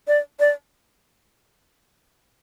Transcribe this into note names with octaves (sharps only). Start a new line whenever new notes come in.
D5
D5